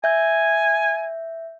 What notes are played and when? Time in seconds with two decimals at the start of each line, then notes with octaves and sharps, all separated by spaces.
0.04 E5 G#5 G6